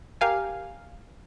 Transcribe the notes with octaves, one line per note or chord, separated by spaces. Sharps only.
G4 A#4 F5 G#5